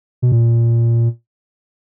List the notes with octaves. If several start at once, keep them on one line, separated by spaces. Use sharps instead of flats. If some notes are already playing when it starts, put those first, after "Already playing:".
B2
A#2